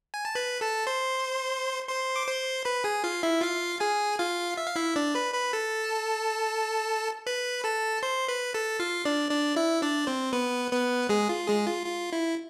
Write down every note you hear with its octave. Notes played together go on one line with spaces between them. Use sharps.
G#5
A5
B4 B5
A4 A5
C5 C6
C5 C6
D6
C5 C6
B4 B5
G#4 G#5
F4 F5
E4 E5
F4 F5
G#4 G#5
F4 F5
E5
F5
E4 E5
D4 D5
B4 B5
B4 B5
A4 A5
B4 B5
A4 A5
C5 C6
B4 B5
A4 A5
F4 F5
D4 D5
D4 D5
E4 E5
D4 D5
C4 C5
B3 B4
B3 B4
G#3 G#4
F4
G#3 G#4
F4
F4
E4